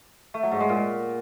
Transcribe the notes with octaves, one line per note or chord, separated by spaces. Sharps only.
A3
F#3
G#2
G#3
A#2